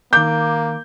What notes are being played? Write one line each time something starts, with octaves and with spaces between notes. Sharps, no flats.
D#3 A#3 D6 G6